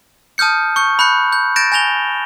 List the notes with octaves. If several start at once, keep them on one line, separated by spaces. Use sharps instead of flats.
A5 D#6 F6 G6 C#7
C#6 G6 C#7
B5 F#6 G6 C#7
G6
G6 A6 A#6 D7 E7
G#5 G6 A#6 F7 G7